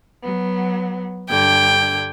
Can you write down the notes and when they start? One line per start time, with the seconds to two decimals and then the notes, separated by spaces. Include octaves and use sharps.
0.23 F#3 B3
1.29 G2 D3 G5 G#6